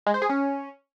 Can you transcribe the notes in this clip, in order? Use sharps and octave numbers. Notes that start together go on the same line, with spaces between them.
G#3
C5
G#4
C#4